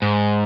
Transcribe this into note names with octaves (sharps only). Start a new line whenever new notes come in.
G#2